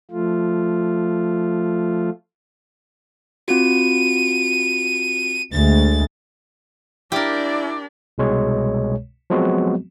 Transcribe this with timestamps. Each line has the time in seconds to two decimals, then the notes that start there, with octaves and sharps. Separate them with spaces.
0.11 F3 A3 F4
3.48 C4 F4 F#4 D#7
5.53 D2 G#3 A6
7.12 D4 E4 G4 A#4 D5
8.18 C2 B2 G#3 C#5
9.30 F3 F#3 G#3 B3 C4 F#4